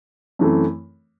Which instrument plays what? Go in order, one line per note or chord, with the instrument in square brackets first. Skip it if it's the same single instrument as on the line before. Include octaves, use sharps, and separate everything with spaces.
[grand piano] F#2 E3 A3 C4